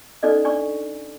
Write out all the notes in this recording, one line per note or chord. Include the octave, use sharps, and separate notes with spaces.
C#4 D#4 A4 D5 D#5
D4 D5 G#5 C#6